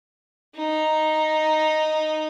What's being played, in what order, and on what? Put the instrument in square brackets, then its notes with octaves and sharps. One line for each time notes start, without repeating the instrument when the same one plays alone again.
[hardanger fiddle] D#4